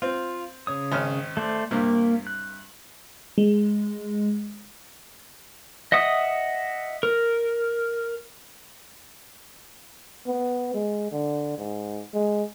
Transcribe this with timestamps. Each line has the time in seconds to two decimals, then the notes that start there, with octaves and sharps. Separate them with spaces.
0.02 C4 F4
0.67 C#3 C#5 D#6
0.92 G#1 C#4 F6
1.37 A3 C5 D5
1.71 G2 C3 A#3
2.27 F#6
3.38 G#3
5.92 D#5 E5 F#5 D#6
7.03 A#4
10.27 B3
10.74 G#3
11.11 D3
11.58 G#2
12.14 G#3